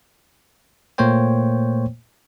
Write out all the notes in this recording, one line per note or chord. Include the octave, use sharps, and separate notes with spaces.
A#2 A3 A#3 C5 C#5 G5